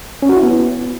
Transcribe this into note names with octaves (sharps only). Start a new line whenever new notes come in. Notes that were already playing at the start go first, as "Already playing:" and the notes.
C#4
F#4
E4
B3